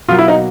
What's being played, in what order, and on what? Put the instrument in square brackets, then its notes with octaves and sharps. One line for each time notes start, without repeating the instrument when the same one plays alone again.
[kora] B2 F#3 A#3 [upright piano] F4
[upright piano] E4
D#4